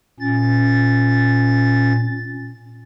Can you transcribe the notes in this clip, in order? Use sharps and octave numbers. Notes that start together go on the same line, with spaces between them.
A#2 C#4 A6